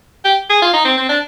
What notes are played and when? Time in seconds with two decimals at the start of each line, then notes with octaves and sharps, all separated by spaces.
0.25 G4
0.50 G#4
0.62 F4
0.73 D#4
0.85 C4
0.97 C4
1.09 D4